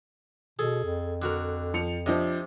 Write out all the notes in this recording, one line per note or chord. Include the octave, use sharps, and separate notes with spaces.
B2 G#4 A4
F2
D3 F#4 A#4
F3 C#7 F7
C3 F3 D4 D#5